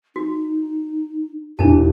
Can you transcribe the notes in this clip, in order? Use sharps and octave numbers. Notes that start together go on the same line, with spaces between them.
D#4 F#4
E1 E3 D4 D#4 G4 A5